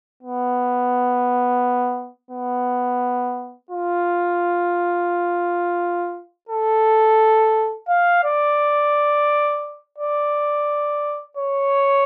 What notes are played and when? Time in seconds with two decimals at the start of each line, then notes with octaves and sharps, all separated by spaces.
0.23 B3
2.31 B3
3.71 F4
6.49 A4
7.89 F5
8.24 D5
9.98 D5
11.37 C#5